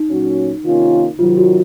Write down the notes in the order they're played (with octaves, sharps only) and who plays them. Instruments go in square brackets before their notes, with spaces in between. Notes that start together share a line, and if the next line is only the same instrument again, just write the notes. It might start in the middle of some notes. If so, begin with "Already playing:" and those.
Already playing: [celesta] D#4
[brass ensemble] A#2 F#3 C#4 F#4
C3 D#3 A#3 C#4 F4
[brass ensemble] C3 D#3 F#3 [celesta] F4
[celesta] F#4